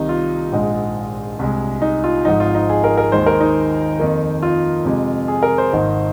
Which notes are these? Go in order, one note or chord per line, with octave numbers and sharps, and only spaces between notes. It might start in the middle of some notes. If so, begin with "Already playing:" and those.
Already playing: C2 C3 D#3 A#3 D#4
F4
A#1 G#2 G#3
C2 C3 G#3
D#4
F4
G#1 G#2 F3 D#4
F4
D#4
G#4
A#4
A#4
D#2 D#3 G#3 C5
A#4
D#4
F2 D#3 A#3
F4
F2 C3 G#3
G#4
A#4
C5
G#1 G#2 D#3 A#3